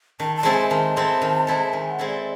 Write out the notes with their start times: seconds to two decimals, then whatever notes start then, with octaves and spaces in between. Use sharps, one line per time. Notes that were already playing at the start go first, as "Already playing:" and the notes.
0.20 D#3 A5
0.36 A5
0.43 G#3 C4 E4 A4
0.54 G#5
0.71 D#3 A5
0.96 G#3 C4 E4 A4
1.22 D#3
1.47 G#3 C4 E4 A4
1.73 D#3 G#5
1.91 F#5
1.99 G#3 C4 E4 A4
2.07 D5